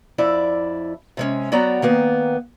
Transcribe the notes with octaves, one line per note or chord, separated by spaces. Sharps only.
F2 E4 D5
C3 G#3 C#4
F#3 B3 F#4 D5 G5 A#5
D#3 A#3 B3